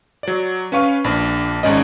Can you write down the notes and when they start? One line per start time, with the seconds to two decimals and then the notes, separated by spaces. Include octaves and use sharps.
0.23 F#3 D5
0.72 C#4 B4 F5 C#6 D#7
1.04 A#1 D4
1.63 G#1 G#2 C#4 D5 D#5